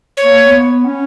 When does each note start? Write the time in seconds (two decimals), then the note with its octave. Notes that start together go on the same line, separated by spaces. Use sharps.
0.17 C#5
0.24 A#3
0.45 B3
0.85 C#4